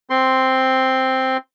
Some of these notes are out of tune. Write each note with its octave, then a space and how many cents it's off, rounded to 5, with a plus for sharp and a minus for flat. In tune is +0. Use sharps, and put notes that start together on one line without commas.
C4 +0 C6 +0